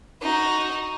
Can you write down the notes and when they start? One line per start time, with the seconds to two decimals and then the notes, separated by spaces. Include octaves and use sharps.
0.22 D#4 F#4